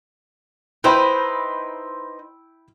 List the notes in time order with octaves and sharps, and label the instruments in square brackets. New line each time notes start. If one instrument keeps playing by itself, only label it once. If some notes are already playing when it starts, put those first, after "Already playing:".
[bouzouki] D#4 B4 C5 [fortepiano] E4 G5 B5